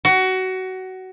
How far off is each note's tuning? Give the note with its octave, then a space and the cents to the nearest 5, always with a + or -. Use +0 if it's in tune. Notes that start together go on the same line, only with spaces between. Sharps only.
F#4 +20